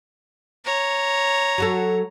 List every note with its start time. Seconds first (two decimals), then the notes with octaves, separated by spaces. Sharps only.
0.65 C#5 A#5
1.58 F#3 F#4 A4